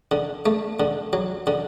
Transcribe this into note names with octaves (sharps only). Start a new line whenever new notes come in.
D3
A3
D3
F#3
D3